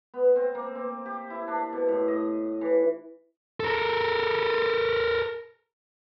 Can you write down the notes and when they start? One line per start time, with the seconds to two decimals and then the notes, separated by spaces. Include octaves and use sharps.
0.14 B3
0.36 C4
0.55 A#3
0.75 C4
1.06 G4
1.30 E4
1.48 D4
1.73 B2
1.88 A2
2.08 D#5
2.61 E3
3.60 A4 A#4